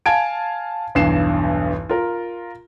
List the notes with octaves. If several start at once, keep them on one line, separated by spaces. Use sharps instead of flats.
F5 G#5 A5 G#6 D7
B1 E2 G2 C7 E7
F4 A#4